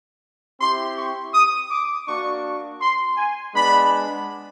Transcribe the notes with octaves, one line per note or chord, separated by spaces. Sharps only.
C4 E4 G4 C6
C#6
D#6
D6
A#3 D4 F#4 C#6
C6
G#5
G#3 B3 D4 B5